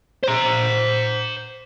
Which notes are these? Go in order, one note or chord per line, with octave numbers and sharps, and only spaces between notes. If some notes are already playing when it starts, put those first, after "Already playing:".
C5 A#5